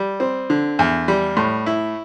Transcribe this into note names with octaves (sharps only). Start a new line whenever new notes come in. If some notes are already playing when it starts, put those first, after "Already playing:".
Already playing: G3
C4
D3
E2
G3
A2
E4